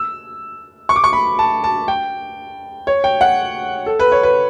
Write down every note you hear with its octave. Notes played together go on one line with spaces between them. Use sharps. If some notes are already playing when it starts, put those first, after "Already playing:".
Already playing: E6
C#6
D6
C#6
B5
A5
A5
G5
C#5
G5
F#5
A4
B4
C#5
B4